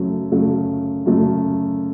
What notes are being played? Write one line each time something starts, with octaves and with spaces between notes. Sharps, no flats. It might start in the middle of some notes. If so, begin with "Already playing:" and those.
Already playing: F#2 C#3 F#3 A3
F#2 C#3 F#3 A3
F#2 C#3 F#3 A3